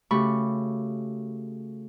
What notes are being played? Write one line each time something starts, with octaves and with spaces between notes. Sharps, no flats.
C#3 A3 F#4 G4 B5 C#6